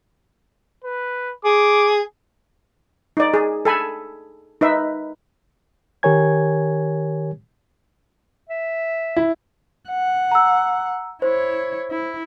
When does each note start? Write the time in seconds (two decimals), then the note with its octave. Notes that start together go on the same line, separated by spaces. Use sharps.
0.84 B4
1.45 G#4 D6
3.17 D#4 D5
3.34 G#4
3.65 A4 G#5 B5
4.61 D#4 B4 E5
6.03 D#3 G4 A#4 C#5 G#5 G#6
8.49 E5
9.17 E4
9.90 F#5
10.31 A#5 E6
11.22 E4 C5 C#5
11.91 E4